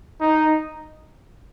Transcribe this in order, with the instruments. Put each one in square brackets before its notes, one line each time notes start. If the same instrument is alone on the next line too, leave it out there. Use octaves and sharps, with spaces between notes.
[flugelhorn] D#4